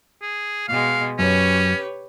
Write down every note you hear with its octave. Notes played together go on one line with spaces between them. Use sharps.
G#4
B2 G#3 F5
F#2 C#4 G4 B4 C#5